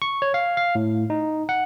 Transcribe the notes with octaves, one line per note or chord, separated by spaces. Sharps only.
C#6
C#5
F5
F5
A2
D#4
F#5